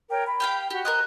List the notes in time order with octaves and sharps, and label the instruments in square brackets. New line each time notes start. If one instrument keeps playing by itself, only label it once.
[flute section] A#4 C#5 G5
B5
[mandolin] G4 F5 G5
[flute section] F#4 [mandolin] G4
[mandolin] A#4 C5 D#5 [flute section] F#6